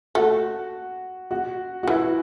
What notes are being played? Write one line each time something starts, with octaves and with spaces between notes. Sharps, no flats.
A3 F#4
F#4
F#4
E3 E4